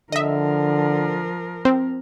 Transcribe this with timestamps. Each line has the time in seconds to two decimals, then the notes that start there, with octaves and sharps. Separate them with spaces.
0.12 D3 F3 A#4 D#5 E5
1.65 C4